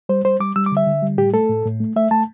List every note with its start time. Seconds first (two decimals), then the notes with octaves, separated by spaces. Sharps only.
0.09 G3 C5
0.25 G3 C5
0.40 G3 D6
0.56 G3 E6
0.66 D6
0.72 D3 E5
0.87 D3
1.02 G3
1.18 A2 G4
1.33 A3 A4
1.49 A2
1.65 A2
1.80 A3
1.96 A3 E5
2.11 A3 A5